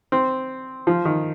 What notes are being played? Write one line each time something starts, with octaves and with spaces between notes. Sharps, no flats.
C4
F3
D#3